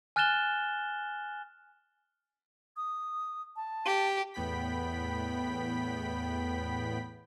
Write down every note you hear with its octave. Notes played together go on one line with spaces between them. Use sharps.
G#5 F6 F#6 A6 E7 G7
D#6
A5
G4
E2 A2 B3 G5 B5 B6